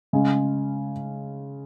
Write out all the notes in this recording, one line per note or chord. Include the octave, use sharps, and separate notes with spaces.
C#3 G#3 C#4